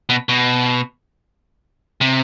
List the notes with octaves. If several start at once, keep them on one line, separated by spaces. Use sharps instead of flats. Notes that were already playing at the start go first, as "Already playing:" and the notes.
B2
B2
C3